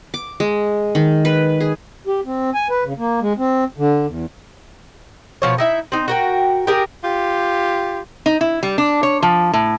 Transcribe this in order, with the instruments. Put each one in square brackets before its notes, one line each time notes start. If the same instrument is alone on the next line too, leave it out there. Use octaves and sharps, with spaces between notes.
[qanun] D6
G#3
D#3
B4
G#4
[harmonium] G4
C4
G#5
B4
C#3
A#3
G#3
C4
D3
E2
[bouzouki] B2 F3 C#5
D#4 E4 E5
C4 D#4
F#4 A#4 G5
G4 G#4 A#4
[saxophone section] F4 G4
[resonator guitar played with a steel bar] D#4
E4
G3
D4
C#5
F3
A2